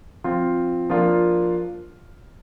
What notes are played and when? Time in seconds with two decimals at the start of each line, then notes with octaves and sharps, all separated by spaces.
0.24 F3 C4 F4
0.90 F3 A#3 D4 F4